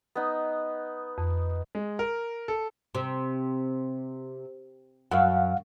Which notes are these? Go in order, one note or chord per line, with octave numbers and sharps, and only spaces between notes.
B3 D#4
F2
G#3
A#4
A4
C3
F#2 F5 F#5